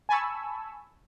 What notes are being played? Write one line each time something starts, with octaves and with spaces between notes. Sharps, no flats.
G#5 A5 B5 C#6 E6